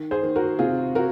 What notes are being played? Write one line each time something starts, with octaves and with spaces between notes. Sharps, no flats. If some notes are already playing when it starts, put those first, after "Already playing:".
Already playing: D#3
G#4 C5
D#3
F#4 A#4
C3 F4 G#4
F#4 A#4